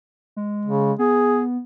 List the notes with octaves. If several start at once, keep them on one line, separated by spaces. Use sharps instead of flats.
G#3
C#3
B3 G#4